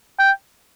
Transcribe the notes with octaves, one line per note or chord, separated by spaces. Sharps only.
G5